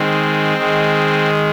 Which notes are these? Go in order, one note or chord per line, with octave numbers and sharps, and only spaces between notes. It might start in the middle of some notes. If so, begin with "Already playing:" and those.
Already playing: D#3 G#3 C4
D#3 G#3